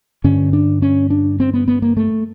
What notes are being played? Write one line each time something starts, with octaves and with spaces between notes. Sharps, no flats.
G2 D3 C#4
D4
C#4
D4
C4
B3
B3
A#3
A3